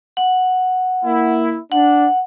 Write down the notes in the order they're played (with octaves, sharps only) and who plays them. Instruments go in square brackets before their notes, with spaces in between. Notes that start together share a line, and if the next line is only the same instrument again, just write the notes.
[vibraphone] F#5
[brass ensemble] A#3 E4
[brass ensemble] D4 [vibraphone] F#5